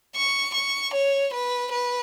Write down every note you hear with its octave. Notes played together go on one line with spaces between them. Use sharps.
C#6
C#6
C#5
B4
B4